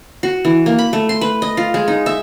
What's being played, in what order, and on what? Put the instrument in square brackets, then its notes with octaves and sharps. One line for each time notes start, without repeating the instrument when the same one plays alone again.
[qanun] F#4
E3
A#3
B5
A3
C6
B4
D#5
F4
G#3
D#4
E5